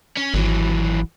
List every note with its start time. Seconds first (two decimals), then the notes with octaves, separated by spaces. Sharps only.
0.17 C#4
0.34 G#1 E3 F#3